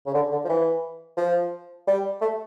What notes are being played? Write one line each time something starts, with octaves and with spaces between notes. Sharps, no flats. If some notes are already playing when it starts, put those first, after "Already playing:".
C#3
D3
D3
F3
E3
F3
G3
A3